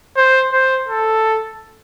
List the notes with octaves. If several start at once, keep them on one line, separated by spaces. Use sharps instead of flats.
C5
C5
A4